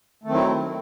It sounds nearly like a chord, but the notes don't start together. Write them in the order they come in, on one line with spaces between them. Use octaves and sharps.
A3 D#3 C4 F#3 E4